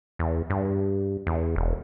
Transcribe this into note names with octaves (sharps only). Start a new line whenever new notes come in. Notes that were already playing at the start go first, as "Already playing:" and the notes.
E2
G2
E2
E1